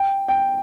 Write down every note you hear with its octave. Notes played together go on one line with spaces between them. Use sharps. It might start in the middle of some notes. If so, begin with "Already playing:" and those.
Already playing: G5
G5